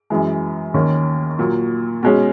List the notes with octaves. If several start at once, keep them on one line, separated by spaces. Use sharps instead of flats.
F#2 E3 G#3
D#2 D#3 A#3 C#4
A#2 F#3 A#3
B2 G#3 C#4